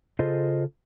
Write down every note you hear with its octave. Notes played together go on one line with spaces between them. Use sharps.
C#3 F4 G#4 A4 C5 D#5